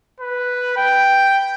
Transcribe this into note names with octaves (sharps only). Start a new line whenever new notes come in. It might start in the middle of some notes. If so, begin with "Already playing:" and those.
B4
G5